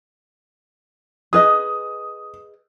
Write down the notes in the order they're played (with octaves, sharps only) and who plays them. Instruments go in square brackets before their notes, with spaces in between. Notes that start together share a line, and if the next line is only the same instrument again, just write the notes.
[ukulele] G#4 B4 D#5 [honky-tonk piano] D#6